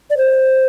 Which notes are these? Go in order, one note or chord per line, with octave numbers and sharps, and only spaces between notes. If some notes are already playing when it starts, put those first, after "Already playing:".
D5
C5